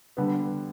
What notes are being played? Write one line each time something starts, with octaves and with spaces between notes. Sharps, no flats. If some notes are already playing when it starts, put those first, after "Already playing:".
D3 G3 B3